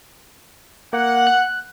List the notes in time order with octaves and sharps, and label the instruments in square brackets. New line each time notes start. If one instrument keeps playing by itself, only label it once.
[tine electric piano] A#3 [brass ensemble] F#5
[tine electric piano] F#6